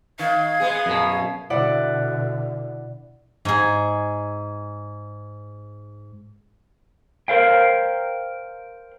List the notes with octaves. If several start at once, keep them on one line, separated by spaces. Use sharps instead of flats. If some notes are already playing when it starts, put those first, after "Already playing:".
D#3 F5 G#6
G#3 B3 G#4
F#2 B2
B2 D3 E4 D5 F#5
G#2 G#4
A#4 C5 F5 G5